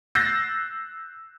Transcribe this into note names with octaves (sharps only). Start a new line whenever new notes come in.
E6 F#6 G6 A6 A#6 C7